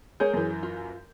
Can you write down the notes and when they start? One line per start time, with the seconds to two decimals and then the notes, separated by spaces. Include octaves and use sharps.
0.20 G#3 G#4 A#4 C#5 G6
0.34 F#2 E3
0.63 F4